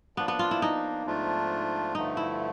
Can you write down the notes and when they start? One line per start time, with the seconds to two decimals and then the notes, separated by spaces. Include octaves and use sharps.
0.17 F3 A#3 B3 D4
0.28 B3
0.39 F4
0.51 E4
0.62 D#4
1.06 G#2 F3 A3 D4 F4
1.95 G2 D3 F3 A3 D#4
2.17 E4